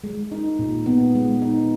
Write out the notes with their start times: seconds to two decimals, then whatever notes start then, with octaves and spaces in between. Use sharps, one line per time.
0.04 G#3
0.32 D#4
0.59 A#2
0.86 B3
1.15 G#3
1.42 D#4